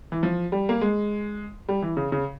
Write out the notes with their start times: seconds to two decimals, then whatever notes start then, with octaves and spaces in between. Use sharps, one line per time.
0.12 E3
0.23 F3
0.52 G3
0.69 A#3
0.81 G#3
1.68 G3
1.82 E3
1.97 C#3
2.12 C#3